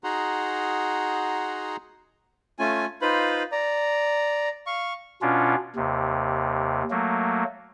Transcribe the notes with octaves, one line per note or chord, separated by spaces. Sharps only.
D#4 F#4 G#4 F#5 A#5 C6
A3 C#4 F4 G#5
D#4 F4 B4 C5 F5 B5
D5 A#5
F5 C#6
B2 C#4 D4 F4
D#2 C3
F#3 A3 A#3